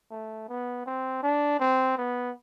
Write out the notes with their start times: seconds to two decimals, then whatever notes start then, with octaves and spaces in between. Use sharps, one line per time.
0.11 A3
0.49 B3
0.86 C4
1.23 D4
1.60 C4
1.98 B3